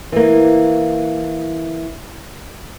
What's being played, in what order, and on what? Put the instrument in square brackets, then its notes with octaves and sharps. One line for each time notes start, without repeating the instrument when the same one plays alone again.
[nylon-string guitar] E3 A#3